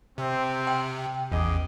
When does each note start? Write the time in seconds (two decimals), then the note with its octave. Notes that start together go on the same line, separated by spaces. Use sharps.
0.18 C3 C4
0.67 G5
1.32 A1 E2 G#4 D#5 D6